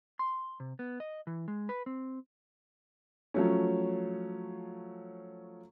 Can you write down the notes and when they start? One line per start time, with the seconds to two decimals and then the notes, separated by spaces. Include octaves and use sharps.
0.19 C6
0.60 C3
0.79 B3
1.00 D#5
1.27 E3
1.48 G#3
1.69 B4
1.86 C4
3.34 F3 F#3 A3 C#4